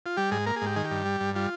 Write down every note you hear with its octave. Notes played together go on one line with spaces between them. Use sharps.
F4
G3 G4
G#2 G#4
A#3 A#4
G#4
G#2 G4
D#3 G#4
G4
G2
G3
G2
G3 F4